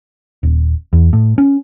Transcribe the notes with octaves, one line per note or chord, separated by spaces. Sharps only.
D#1
E2
A2
C#4